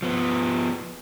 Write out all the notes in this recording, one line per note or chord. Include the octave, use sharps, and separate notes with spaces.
F3 B3